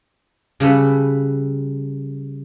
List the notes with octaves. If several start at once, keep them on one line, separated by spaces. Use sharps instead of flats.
C#3 G3 A4 B4